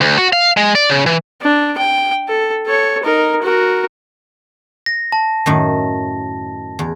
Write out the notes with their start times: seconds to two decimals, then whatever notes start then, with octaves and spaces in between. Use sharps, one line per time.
0.01 D2
0.18 F#4
0.33 F5
0.57 G#3
0.75 D5
0.90 C#3
1.06 E3
1.42 D4
1.78 G5
2.28 A4
2.66 A4 C#5
3.03 D#4 A#4
3.42 F#4 A#4
4.86 A#6
5.12 A5
5.46 F#2 A2 D#3
6.79 E2